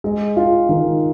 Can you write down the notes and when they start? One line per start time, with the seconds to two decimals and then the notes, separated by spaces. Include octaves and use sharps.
0.04 G#3
0.36 F4
0.69 D#3